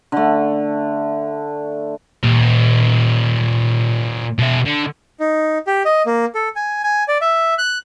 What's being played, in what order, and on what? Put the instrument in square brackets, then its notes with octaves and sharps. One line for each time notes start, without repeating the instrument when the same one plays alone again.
[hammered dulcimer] D3 A3
[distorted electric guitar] A#2 G4
B2 E5
D3
[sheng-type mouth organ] D#4
G4
D#5
A#3
A4
G#5
G#5
D5
E5
F#6